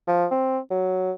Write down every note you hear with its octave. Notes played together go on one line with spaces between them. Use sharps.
F3
C4
F#3